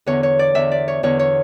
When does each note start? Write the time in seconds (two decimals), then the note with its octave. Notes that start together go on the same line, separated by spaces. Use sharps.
0.06 E2 D3 C#5
0.23 C#5
0.39 D5
0.55 E2 D3 E5
0.71 D5
0.88 C#5
1.03 E2 D3 C#5
1.19 C#5